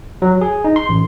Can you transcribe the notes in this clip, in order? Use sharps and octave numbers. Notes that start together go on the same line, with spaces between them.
F#3
G#4
D#4
C6
A1